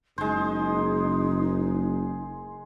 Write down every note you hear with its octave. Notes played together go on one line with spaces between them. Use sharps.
F#1 G#3 D#4 C5